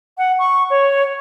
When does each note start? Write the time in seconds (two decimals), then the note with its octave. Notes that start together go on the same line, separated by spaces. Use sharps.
0.17 F#5
0.39 C#6
0.70 C#5